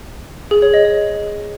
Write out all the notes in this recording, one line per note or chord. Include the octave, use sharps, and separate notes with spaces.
G#4
C#5
D#5
C#5